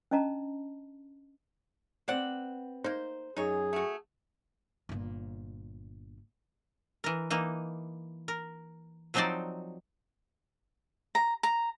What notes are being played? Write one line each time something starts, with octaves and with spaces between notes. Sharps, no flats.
C#4 D4 D#5 A5 A#5
B3 C4 C5 D5 F#5
A#3 D#4 C5
F#2 D#4 G#4 C#5
A3 F#4
G1 A#2
E3 A#4
E3 A#3 D#4
A#4
F3 F#3 C4 D#4 C5 D5
A#5
A#5